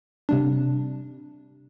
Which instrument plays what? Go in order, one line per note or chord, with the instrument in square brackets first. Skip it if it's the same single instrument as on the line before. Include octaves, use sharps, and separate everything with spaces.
[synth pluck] C3 G3 D4